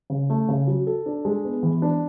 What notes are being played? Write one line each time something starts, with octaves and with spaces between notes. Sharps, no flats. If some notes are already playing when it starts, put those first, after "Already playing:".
C#3
A3
C#3
F#3
A4
D4
G#3
B3
E3
D4